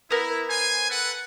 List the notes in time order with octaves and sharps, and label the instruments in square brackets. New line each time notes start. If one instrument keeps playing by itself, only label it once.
[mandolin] B3 A#4 [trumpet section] E4
[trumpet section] C5 G#5
A4 B4 F#5